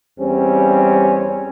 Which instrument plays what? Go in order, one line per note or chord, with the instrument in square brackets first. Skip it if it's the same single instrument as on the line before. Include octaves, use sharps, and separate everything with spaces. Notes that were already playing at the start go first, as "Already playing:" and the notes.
[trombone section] E2 G3 C4 C#4